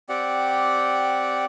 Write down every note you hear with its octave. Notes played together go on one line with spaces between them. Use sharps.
C4 G4 D5 F#5